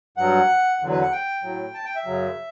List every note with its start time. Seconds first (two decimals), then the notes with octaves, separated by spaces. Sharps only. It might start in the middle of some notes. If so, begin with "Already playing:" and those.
0.17 G2 F#3 F#5
0.80 E2 D3 F#3
0.91 B4
1.01 F#5
1.12 G5
1.43 A2 F#3
1.74 A5
1.85 G5
1.95 E5
2.06 F#2 C#3 F#3